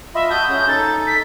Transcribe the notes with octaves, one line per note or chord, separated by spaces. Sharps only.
F4 D#5 E5 B5
F#4 A5 D#6 G6
C#4 G#4
D#4 A4 A6
B6